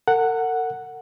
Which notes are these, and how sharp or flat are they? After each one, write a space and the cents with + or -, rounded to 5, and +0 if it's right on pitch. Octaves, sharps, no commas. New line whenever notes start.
A#4 -45 F#5 +0